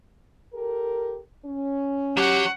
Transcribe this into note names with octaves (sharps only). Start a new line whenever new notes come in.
G4 A4 A#4
C#4
F#3 G4 C#5 F#5